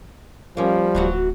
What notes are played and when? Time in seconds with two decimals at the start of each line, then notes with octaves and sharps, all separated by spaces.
0.57 F3 G3 A#3 C#4
0.95 D1 E3 F#3 F#4